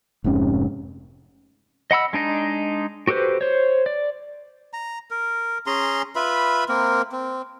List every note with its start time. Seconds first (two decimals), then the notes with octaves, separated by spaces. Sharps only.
0.24 F1 G#2 C3 C#4
1.91 D#5 F#5 B5 E6
2.13 G#3 D4 D#4 D#5
3.07 F#4 G4 A4 B4 C5
3.41 C5 C#5
3.86 D5
4.73 A#5
5.11 A#4
5.67 C#4 G#4 A#5 C6
6.15 F4 B4 E5 B5
6.69 A#3 C4 A#4
7.12 C4